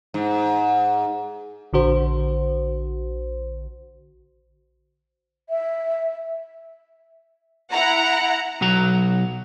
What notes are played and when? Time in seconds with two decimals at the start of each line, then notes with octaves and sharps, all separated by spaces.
0.14 G#2
1.73 A#1 D3 F#4 C5
5.49 E5
7.71 E4 F#5 A#5
8.61 B1 F#3 F#4 A#5